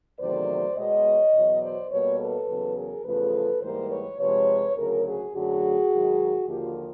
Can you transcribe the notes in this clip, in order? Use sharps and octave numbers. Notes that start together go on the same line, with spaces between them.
E2 C3 D#3 F#3 A3 C5 D5
B2 G#3 B3 C#5 D#5
E2 B2 F#3
C5 D5
B2 G3 A#3 B4 C#5
A4 B4
E2 C#3 F#3 B3
G#4 A#4
E2 C#3 F3 A3 A4 B4
G#2 E3 G3 A#3 A#4 C5
B4 C#5
C3 F3 G#3 B4 C#5
D2 C#3 F#3 G#4 A#4
F#4 G#4
F#2 D3 F#3 A3 F#4 G#4
G#2 D#3 F#3
D#2 D3 F3 A#3 F4 G4